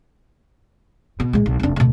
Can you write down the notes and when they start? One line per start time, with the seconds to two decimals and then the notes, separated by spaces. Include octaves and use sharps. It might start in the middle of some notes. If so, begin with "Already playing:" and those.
1.20 B2
1.33 A#1 G#3
1.46 B1
1.60 F1 D4
1.76 D2 B2